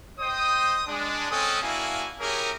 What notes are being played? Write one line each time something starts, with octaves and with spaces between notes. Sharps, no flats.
C5 D#5 G5 D#6
G#3 D4
G#3 C4 C#4 A4 G#5 D#6
A#3 D4 E4 F#4 F5 G#5
C#4 E4 G4 G#4 A#4